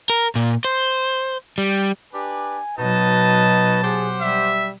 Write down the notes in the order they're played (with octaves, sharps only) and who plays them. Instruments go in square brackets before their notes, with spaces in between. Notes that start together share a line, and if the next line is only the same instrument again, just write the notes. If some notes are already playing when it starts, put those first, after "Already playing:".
[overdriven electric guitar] A#4
A#2
C5
G3
[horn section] D4 G4 B4 [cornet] G#5
[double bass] B2 F#3 [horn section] D#4 F#4 D#5 [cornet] B4 [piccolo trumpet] A5
[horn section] G4 C5 F#5 [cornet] G#4
[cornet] G3 [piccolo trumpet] E5